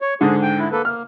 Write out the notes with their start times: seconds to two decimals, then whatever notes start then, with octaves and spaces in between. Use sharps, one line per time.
0.01 C#5
0.21 G#2 D3 G#4
0.42 G5
0.59 E4
0.72 A#3 A4 B4
0.85 A#3 F6